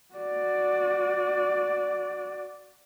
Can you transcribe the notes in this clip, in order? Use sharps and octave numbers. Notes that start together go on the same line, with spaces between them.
F#4 D5